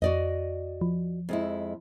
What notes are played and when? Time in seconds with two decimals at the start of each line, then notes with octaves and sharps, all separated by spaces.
0.02 F2 F#4 D5 D#5
0.81 F3
1.29 F2 G#3 E4